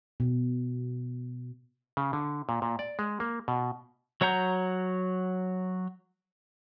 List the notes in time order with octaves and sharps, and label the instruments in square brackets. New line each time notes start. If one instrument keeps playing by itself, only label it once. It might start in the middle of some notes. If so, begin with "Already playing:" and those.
[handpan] B2
[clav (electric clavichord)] C#3
D3
A#2
A#2
D5
G#3
A#3
B2
[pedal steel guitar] F#3 C#5 F#5 A#5 G6